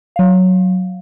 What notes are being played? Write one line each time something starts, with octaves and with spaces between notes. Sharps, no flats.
F#3 F5